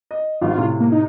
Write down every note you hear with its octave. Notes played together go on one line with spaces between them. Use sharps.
D#5
G#1 G2 F4
A2 C3
A#3
D#4